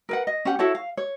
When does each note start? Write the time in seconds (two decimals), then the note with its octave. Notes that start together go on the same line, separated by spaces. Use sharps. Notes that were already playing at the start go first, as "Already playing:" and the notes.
0.09 A#4 B4 F#5
0.27 D#5
0.45 C#4 G4 F#5
0.59 E4 F#4 A4 C#5
0.75 F5
0.97 C#5